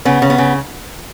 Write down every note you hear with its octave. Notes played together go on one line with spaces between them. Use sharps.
C#3 B3
C#3
B3
C#3